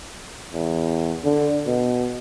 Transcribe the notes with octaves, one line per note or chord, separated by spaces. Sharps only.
E2
D3
B2